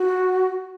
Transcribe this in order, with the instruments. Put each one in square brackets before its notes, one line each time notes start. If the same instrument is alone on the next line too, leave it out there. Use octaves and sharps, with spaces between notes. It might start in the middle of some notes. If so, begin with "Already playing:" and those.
Already playing: [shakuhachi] F#4